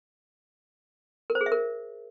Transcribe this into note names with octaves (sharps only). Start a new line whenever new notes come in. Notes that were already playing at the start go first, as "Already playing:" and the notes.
A#4
C5
G#4
E5
A#4